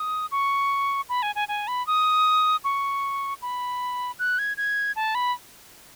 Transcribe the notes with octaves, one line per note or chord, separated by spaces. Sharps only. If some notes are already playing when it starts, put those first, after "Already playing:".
Already playing: D#6
C#6
B5
G#5
G#5
G#5
B5
D#6
C#6
B5
F#6
G#6
G#6
A5
B5